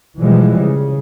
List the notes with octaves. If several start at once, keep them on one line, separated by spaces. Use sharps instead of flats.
B2 E3 F3 G3 G#3
C#3